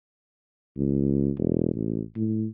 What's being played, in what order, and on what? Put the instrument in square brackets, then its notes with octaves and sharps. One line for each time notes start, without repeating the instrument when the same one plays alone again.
[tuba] C#2
E1
A1
A2